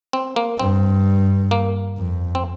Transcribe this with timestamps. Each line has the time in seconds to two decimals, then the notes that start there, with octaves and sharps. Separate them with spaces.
0.13 C4
0.36 A#3
0.59 G2 C4
1.51 A#3
1.98 F2
2.35 C4